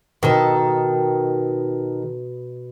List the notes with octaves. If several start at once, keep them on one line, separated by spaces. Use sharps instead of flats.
B2 D#3 A4